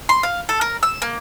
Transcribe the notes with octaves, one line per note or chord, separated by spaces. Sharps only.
C6
F5
A4
A#4
E6
A#3